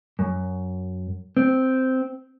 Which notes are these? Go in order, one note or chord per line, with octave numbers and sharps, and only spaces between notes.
F#2
C4